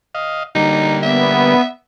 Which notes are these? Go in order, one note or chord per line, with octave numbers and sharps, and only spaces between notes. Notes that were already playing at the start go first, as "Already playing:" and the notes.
D#5 F5
D3 G3 A#3 D#4
B3 E5